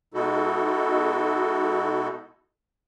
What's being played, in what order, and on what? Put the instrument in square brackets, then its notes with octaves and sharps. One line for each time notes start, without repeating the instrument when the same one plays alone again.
[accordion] B2 G#3 D#4 E4 F#4 A4